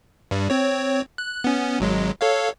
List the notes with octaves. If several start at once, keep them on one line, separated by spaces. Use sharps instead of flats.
G2 G3
C4 C#5
F#6
B3 C#4
G#1 F#3 G#3
A4 C#5 F5